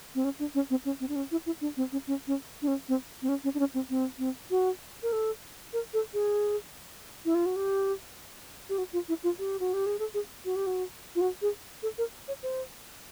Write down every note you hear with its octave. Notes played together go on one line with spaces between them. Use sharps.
C4
C#4
D4
C#4
C4
C#4
C4
D4
C#4
E4
E4
D4
C4
C#4
C#4
C#4
D4
C#4
C4
C4
C#4
C#4
D4
C#4
C4
C4
C4
F#4
A#4
A4
A#4
A4
G#4
E4
F4
F#4
G4
G4
F#4
F4
E4
F4
G4
F#4
G4
G#4
A4
G#4
F#4
G4
F#4
F4
F#4
G#4
A4
A#4
C#5
C5